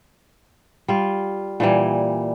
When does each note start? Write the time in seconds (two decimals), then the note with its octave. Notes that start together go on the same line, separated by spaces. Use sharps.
0.88 G3 F4
1.60 A#2 E3 G3